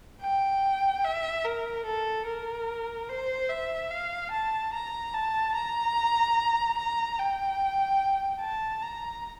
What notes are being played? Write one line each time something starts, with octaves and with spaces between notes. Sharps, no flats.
G5
E5
A#4
A4
A#4
C5
E5
F5
A5
A#5
A5
A#5
A#5
G5
A5
A#5